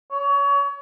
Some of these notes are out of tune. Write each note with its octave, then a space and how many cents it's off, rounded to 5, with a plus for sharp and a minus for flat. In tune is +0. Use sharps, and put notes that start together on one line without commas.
C#5 +30